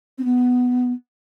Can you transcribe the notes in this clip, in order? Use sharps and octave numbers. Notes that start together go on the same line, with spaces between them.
C4
B3